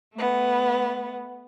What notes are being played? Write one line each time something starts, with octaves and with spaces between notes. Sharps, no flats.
A3 B3